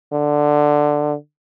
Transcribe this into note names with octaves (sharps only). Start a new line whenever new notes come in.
D3